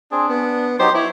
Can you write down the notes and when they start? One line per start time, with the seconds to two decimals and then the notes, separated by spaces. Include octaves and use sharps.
0.12 C4 D4 G#4
0.29 B3
0.80 F#3 D#4 G4 C5
0.95 E4 C#5